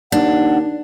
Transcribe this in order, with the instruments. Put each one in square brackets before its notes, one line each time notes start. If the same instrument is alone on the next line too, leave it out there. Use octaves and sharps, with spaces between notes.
[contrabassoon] D#2 [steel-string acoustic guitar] D4 [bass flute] F#5